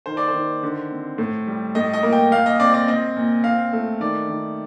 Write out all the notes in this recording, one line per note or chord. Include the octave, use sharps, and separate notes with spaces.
D#3 C5
D5
C5
D#3
D3
C4
A2
G3
A2 D#5
D#5
A#3
G5
A#2 F5
D#5
C4 D5
D5
C4 D#5
A#2
C4 F5
A3
D#3 D5
D#3